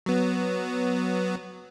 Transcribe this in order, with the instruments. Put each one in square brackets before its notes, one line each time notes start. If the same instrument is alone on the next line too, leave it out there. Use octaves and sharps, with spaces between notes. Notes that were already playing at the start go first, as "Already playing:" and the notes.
[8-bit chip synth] F#3 B3